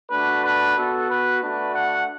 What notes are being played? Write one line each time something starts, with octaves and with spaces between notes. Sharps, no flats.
A3 D4 F#4 B4
B4
B3 F#4 A4
B4
A3 D4 F#4 B4
F#5